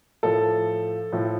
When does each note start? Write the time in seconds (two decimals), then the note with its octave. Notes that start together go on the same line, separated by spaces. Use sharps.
0.23 A2 F3 A4
1.12 A2 F3